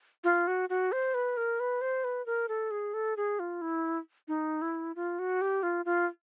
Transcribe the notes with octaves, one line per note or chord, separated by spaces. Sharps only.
F4
F#4
F#4
C5
B4
A#4
B4
C5
B4
A#4
A4
G#4
A4
G#4
F4
E4
D#4
E4
F4
F#4
G4
F4
F4